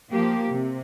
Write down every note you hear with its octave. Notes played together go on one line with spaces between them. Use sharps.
F3 A#3 G4
C3